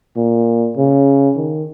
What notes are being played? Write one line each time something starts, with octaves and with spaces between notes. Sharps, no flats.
A#2
C#3
D#3